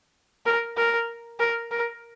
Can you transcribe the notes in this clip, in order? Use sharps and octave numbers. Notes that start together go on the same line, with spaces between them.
A#4
A#4
A#4
A#4